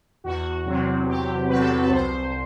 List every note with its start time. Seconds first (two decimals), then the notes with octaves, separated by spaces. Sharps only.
0.24 E2 F#4
0.65 C3 F#3 C4
1.06 E2 G4
1.48 C3 F#3 C4 B4
1.58 A4
1.69 B4
1.83 B4
1.89 C2 C5